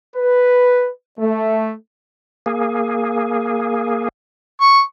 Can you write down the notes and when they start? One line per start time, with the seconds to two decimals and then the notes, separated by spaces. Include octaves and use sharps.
0.15 B4
1.19 A3
2.46 A#3 G#4
4.61 C#6